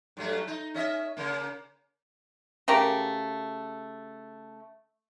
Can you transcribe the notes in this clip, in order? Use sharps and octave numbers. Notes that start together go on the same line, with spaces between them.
G2 F#3 A3
D#4
C#4 D#5 E5
C#3 A#3
C#3 A3 G4 A#4